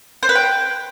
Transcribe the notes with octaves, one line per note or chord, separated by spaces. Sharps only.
C5
B4
G5